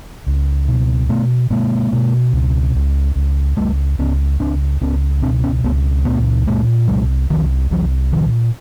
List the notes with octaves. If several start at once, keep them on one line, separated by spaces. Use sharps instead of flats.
C#2
B2
B2 A3 B3
B2 G#3 A#3
B2
C#2
C#2
C#2
C#2 G3 A3
C#2 B3 C#4
C#2 C4 D4
C#2 B3 C#4
B2 C4 D4
B3 C#4
C#2 A3 B3
A#2 A3 B3
A#2 G#3 A#3
C2 F#3 G#3
C2 D#3 F3
C2 E3 F#3
A#2 D#3 F3